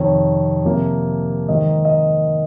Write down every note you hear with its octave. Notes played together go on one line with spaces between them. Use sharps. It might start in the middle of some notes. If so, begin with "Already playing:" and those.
Already playing: F2 C3 D#3 C#5
C3 F3 A#3
G#2 D#3 A#3 D#5
D#5